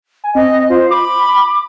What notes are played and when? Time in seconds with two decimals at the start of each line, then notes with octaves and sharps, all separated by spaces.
0.24 G#5
0.35 C4 D#5
0.70 F4 C5
0.90 B5 D6